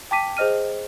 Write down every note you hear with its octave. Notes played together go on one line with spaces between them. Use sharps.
G5 A5 D6 B6 D#7
G#4 C5 D#5 F6 D#7